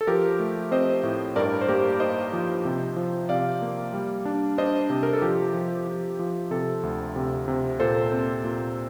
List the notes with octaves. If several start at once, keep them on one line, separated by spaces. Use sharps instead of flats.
A4
F3 G4 A#4
A3
C4 C5 D#5
A2
G2 A#4 D5
C5
A#3 G4 A#4
D#4 C5 D#5
F3
C3
F3
C3 D5 F5
A#3
G3
D4
D4 C5 D#5
C3
A#4
A4
F3 G4
F3
F3
F3
C3 A4
D2
C3
C3
A#2 A4 C5
C4
A#2